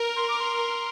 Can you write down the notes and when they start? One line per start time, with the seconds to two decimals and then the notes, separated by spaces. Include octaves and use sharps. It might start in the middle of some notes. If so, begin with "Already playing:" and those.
Already playing: A#4
0.16 C6
0.29 D6
0.39 C6